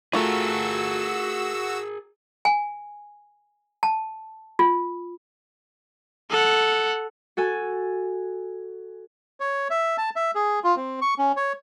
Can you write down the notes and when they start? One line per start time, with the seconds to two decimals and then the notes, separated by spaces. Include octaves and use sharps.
0.13 A3 F4 F#4 G#4 A#4 E6
2.45 G#5
3.83 A5
4.59 F4
6.30 A4 F#5
7.37 F#4 A4 G#5
9.40 C#5
9.70 E5
9.98 A5
10.16 E5
10.35 G#4
10.64 F4
10.76 C4
11.02 C#6
11.18 C#4
11.37 C#5